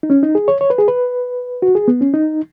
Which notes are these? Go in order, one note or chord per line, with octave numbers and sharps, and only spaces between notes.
D#4
C#4
D#4
G#4
C#5
C#5
B4
G#4
B4
F#4
G#4
B3
C#4
D#4